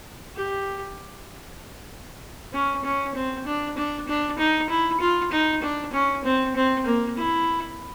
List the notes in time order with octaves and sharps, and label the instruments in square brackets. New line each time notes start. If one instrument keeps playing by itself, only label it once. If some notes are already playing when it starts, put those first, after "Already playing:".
[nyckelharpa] G4
C#4
C#4
C4
D4
D4
D4
D#4
E4
F4
D#4
D4
C#4
C4
C4
A#3
E4